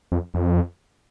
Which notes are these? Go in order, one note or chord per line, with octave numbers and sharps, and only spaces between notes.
F2
F2